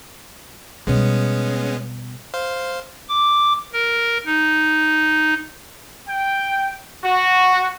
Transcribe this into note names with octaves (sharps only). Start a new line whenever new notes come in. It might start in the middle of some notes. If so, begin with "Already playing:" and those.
B2 G3 G#3 B3 C#4
C5 F5
D6
A#4
D#4
G5
F#4